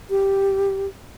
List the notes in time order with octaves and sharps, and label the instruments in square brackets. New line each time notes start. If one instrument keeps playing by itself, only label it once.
[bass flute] G4